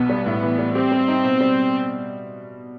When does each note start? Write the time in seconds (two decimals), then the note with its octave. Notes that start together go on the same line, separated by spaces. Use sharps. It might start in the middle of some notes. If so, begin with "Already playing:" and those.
Already playing: B1 B2 B3
0.09 G3
0.26 A2
0.42 E3
0.59 G3
0.75 C4 G4
0.92 G3
1.08 D#4
1.24 B2
1.41 G3